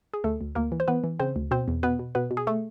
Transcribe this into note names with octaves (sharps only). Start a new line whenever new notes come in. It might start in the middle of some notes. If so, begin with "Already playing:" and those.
G#4
D2 A3 A4
D2
D2 A#3 A#4
E3
C5
E3 B3 B4
E3
C#3 C4 C5
D2
B2 C4 C5
E2
B2 B3 B4
B2
B2 B3 B4
B2
G#4
A3 A4